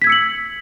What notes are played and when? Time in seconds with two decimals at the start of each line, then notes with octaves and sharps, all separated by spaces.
0.02 B6
0.04 G#6
0.07 E6
0.10 C#7
0.12 F#7